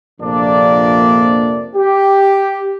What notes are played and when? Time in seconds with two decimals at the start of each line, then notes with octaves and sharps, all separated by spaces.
0.21 A#1 F2 C3 A#3 D4 D5
1.76 G4